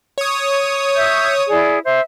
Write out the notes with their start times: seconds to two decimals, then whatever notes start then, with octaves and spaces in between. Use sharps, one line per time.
0.18 C#5 D#6
0.95 E5 G6
1.50 E4 G#4 D5
1.84 C5 E5